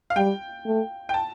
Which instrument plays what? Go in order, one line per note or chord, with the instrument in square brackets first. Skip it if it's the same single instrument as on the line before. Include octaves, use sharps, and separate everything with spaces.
[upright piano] F5
[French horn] G3 [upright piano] G5
[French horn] A3
[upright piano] G5
A5